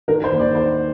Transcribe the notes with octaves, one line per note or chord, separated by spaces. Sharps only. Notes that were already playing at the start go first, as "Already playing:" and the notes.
D#3 A#4
C5
D#2
D5
D#3 C5